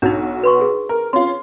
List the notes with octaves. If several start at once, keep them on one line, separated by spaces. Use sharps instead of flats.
B1 D4 D#4 F#4
B4 C6 C#6
G#4
A#4
C#4 F4 C6